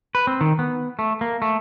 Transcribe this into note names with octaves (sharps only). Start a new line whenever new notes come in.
B4
C4
D#3
B3
A3
A#3
A3